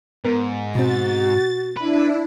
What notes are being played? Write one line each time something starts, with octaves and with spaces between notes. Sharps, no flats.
G#2 B3 A#4
B2 C4 F#4 A6
D4 E4 B4